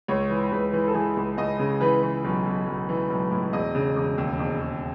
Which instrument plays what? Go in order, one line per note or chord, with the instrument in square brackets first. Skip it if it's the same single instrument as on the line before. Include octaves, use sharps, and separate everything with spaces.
[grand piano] C#2 C#5
E3
C#2 B4
E3
A4
E3 G#4
C#2
C#2 D#5
C#3
E3 B4
E3
B1
B1
B1
E3
B1
A2
E1 D#5
C#3
E1
D#2
E1
E1